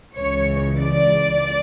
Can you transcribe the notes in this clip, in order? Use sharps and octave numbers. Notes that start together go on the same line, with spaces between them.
C#2 C#3 E3 C#5
D5